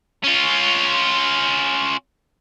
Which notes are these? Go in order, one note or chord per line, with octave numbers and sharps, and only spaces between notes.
C#4 F4